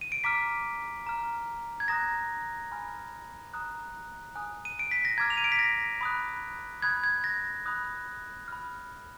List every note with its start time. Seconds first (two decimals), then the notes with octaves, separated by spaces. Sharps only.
0.01 D#7
0.12 D7
0.24 A#5 D6 F6 B6
1.06 A#5 F6
1.80 G#6
1.88 A#5 D#6 F#6 A#6
2.72 G#5 B5 F6
3.54 A#5 D#6 F#6
4.35 G#5 D#6 F#6
4.65 D#7
4.79 D7
4.91 B6
5.05 A#6
5.18 A#5 D6 F6 G#6
5.30 F7
5.37 D#7
5.44 D7
5.52 B6
5.59 A#6
6.01 B5 D#6 F#6
6.82 B5 D#6 F#6 G#6
7.04 G#6
7.24 A#6
7.66 B5 D#6 F#6
8.48 B5 F6